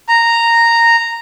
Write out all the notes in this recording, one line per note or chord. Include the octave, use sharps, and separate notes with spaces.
A#5